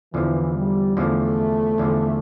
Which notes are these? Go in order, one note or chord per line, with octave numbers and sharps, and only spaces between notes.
E2 D3 E3 F3
G3
E2 D3 F3 A3
E2 D3 F3